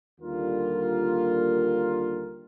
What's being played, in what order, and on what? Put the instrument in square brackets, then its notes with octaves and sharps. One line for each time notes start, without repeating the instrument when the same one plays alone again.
[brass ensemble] D#2 D3 G3 A#3 F4